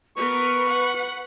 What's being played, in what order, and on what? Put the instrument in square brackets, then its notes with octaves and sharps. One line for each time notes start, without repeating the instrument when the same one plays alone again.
[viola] B3 A#4 [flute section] B4 [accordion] C#6
[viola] F#5